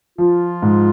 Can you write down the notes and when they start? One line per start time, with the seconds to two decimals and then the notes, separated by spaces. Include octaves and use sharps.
0.18 F3 F4
0.62 G#2